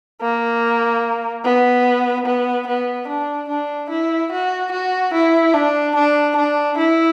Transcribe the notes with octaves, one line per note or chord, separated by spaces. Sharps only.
A#3
B3
B3
B3
D4
D4
E4
F#4
F#4
E4
D4
D4
D4
E4